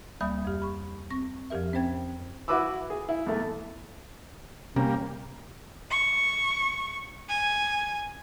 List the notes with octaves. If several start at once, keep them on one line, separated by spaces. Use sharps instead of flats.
D2 G3 A#3 E5 B5 D#6
F2 G4
B5 C#6
C4 C#6 A#6
F2 F3 G4 A#4 E5
C4 C#4 C5 G5 G#6
E4 F#4 B4 B5 D6 E6
G#4
E4
E2 A3
C3 G3 A#3 C#4
C#6
G#5